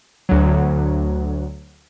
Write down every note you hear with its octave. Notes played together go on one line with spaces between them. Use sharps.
D2 F#3